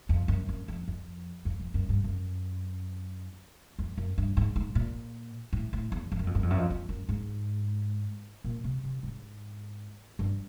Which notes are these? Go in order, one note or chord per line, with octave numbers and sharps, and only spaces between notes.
F2
F#2
F#2
F2
F2
F2
F2
F#2
G2
F#2
F2
F#2
G2
G#2
G#2
A#2
A2
A2
E2
F2
F#2
F2
F#2
F2
F#2
F2
F2
F#2
G#2
A#2
C3
C3
G#2
G2